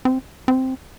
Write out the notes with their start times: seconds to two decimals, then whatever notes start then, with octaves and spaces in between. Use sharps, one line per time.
0.05 C4
0.48 C4